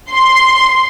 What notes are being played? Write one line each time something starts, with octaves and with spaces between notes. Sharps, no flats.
C6